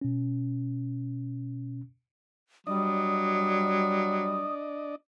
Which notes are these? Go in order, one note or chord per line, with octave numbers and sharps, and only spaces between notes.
B2 C#4
F#3 G3 D4 D5 D#5 D#6